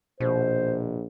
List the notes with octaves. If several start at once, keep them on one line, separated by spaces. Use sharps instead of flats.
A#1 B2 C5